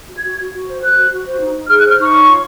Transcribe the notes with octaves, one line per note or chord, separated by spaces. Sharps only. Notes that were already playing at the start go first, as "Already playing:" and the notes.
F#4
G#6
F#4
F#4
F#4
C5
C5 F#6
F#4
F#4
C5
D#4
D#4
G#4 F6
F#6
C5
F6
D#4 C#6
C#5
F4